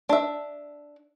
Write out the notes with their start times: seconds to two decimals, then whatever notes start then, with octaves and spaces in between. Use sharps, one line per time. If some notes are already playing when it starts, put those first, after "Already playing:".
0.09 D4 E5